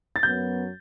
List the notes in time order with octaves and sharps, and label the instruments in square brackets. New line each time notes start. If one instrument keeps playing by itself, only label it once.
[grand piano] A6
[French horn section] F#2 F#3 B3 [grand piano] G6